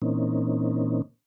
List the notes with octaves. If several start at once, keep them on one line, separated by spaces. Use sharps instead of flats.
A#2 E3 A#3 C4 C#4 D#4